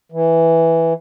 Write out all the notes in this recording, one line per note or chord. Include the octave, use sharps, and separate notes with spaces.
E3